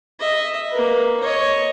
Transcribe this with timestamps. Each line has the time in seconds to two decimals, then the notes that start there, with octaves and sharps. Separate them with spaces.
0.20 D#5 E5
0.71 A#3 B4
1.20 C#5 D#5